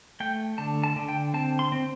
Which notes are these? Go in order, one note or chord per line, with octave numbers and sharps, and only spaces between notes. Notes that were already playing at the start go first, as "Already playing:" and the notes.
A3 G5
D3 A5
A5
D3
G5
C4 A5
C6
C4